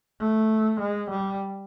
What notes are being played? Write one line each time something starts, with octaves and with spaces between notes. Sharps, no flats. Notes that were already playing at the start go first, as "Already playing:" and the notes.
A3
G#3
G3